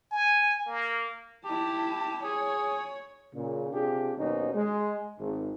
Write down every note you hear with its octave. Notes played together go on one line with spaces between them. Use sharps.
G#5
A#3
E4 G4 A5
G#4 C#5
A#2 C#3
C3 D4 F4 G4 G#4
D#2 B2 F#3 C#4 D#4 C5
G#3
G#1